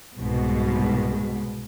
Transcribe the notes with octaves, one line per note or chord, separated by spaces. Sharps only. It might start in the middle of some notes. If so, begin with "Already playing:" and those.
C2 G#2 B2 G#3